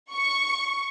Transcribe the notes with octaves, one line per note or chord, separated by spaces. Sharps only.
C#6